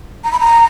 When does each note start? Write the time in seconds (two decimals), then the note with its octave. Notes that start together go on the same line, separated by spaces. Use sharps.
0.24 A#5
0.32 B5
0.40 A#5